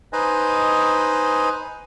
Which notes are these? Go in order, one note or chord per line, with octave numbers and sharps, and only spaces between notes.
D#4 B4 C5 D#5 G#5